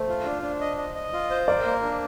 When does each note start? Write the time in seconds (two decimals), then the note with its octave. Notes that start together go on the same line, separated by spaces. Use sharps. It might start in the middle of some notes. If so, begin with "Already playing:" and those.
Already playing: A3 C5
0.09 F4
0.25 D4
0.42 D4
0.61 D#5
0.77 D#5
0.95 D#5
1.13 F4
1.30 C5
1.48 A#4 D5
1.65 A#3
1.83 D4